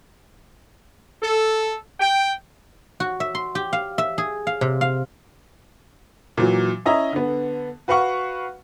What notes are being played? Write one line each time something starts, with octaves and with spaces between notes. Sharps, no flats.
A4
G5
F#4
E5
C6
G4
F5
E5
G#4
F5
C3
F5
A#2 E3 F#3
C#4 E4 D#5 E5 A#5
D3 B3
F#4 B4 F5 F#5 C#6